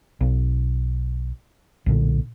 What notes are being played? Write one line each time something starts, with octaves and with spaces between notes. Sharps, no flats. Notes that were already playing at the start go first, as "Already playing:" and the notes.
B1
B1 A#2 D3